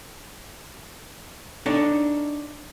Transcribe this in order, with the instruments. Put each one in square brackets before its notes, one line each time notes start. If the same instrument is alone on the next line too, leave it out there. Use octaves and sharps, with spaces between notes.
[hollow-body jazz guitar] D4 D#4 A4 C#5